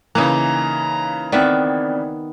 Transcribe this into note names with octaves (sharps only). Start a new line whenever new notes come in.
C#3 E3 A#3 D#4 A#5
D#3 B3 C4 D5 E5